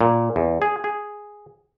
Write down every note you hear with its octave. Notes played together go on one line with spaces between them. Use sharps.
A#2
E2
G#4
G#4